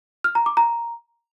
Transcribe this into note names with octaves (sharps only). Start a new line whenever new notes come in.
F6
A#5
D6
A#5